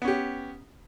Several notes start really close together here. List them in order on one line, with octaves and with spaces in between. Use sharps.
B3 C#4 G4